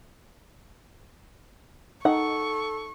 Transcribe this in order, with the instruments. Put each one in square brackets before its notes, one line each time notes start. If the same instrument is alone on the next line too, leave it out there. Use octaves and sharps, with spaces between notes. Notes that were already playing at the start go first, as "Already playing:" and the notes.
[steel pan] D#4 [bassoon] A4 [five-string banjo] F#5 [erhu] C#6